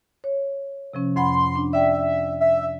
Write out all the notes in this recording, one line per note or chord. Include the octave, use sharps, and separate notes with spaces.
C#5
C3 F3 C#4
F2 F#5 B5 C6
D4
D5 E5 G5
E5